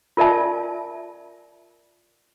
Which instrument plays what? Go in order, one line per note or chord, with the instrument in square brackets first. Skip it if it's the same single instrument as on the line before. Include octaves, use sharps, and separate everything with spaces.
[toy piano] F4 A#4 D5 E5 A5